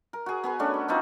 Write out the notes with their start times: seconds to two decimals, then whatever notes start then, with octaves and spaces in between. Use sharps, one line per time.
0.13 A#4
0.26 F#4 G#4
0.44 B3 G#4 B4
0.59 A3 C#4 D4 F#4
0.74 A#5
0.88 B3 C4 D#4 F4